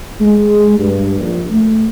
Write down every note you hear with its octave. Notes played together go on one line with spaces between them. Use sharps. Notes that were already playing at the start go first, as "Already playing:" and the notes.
G#3
G2
A#1
A3